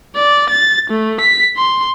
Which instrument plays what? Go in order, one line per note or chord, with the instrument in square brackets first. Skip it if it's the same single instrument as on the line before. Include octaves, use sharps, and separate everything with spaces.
[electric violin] D5
A6
A3
B6
C6